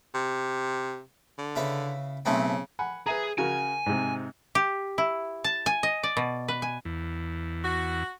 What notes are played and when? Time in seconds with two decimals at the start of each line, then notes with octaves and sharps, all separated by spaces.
0.14 C3
1.38 D3
1.56 C#3 E4 B4
2.25 B1 C#3 A3 C4
2.79 F#5 G#5 B5
3.06 G#4 B4 E5 A#5
3.38 C#3 F#4 A#4 G#5
3.86 G#2 C3
4.55 G4
4.98 E4
5.44 A5
5.66 G#5
5.83 D#5
6.03 D5
6.17 B2
6.48 B4
6.62 G#5
6.85 E2
7.64 F#4